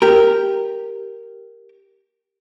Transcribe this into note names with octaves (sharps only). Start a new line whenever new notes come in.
G4 A#4